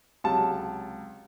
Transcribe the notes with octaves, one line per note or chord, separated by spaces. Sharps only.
C#2 C3 F#3 A5